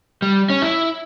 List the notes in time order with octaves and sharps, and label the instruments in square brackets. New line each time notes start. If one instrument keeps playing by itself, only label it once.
[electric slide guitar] G3
C#4
E4